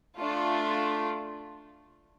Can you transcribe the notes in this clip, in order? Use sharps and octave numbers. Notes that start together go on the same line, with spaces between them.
A3 D4 F4